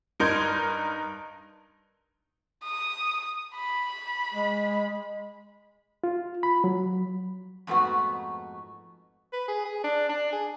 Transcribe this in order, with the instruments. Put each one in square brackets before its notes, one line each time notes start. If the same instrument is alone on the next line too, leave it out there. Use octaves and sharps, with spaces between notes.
[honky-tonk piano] G2 D#4 A#4 C6 G6 G#6
[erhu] D#6
B5
[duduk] G#3
[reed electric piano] F4
B5
F#3
[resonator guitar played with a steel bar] F2 G#2 A3 B3 F#4
[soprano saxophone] B4
G#4
G#4
D4
D4
G#4